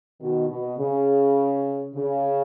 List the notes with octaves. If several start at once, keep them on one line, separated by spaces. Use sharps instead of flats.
B2 D#3
B2
C#3
C#3